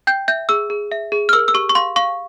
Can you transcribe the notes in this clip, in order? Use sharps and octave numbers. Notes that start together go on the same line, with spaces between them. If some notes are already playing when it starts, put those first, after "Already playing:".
G5 G6
E5 G6
G#4 E6
G#4
E5
G#4
F6
A#4 E6
E6
G4 C#6
C#6
F5 C6
F5 C#6